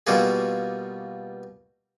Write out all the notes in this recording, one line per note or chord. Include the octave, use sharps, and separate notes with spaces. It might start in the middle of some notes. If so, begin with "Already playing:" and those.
B2 G3 A#3 F4 F#4 G#4